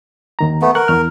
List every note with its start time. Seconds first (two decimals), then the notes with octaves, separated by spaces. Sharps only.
0.39 D#2 D#3 A#5
0.62 A3 B3
0.75 A#4 F#5 C#6 F#6
0.88 E2 F6